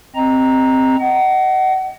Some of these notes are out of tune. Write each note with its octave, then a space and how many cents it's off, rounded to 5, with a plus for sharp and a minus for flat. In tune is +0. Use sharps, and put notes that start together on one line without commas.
C4 +0 D#5 +0 A#5 +0
D#5 +0 F#5 +30